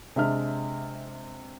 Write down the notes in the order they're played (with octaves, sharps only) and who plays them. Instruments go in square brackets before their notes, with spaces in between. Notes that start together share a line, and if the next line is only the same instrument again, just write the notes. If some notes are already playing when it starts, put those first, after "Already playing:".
[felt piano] C3 G#3 D4 E5 F6